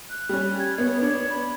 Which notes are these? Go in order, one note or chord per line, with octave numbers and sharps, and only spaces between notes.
F#6
G3 C#4
G#6
B3 C#5
B3 D4
B5